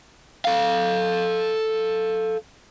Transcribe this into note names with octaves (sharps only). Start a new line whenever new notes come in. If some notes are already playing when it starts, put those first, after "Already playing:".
A4 F5